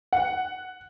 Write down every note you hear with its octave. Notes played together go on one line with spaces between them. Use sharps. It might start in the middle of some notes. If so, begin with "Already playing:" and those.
F#5